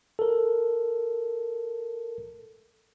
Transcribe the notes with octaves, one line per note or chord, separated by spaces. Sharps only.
A4 A#4